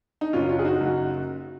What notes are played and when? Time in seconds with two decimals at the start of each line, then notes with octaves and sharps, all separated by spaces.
0.21 D#4
0.33 F#1 F#2 C#3 F#3 C#4 F4
0.49 C#4 F4
0.59 G#4
0.65 D#4 F#4
0.80 F#1 F#2 C#3 F#3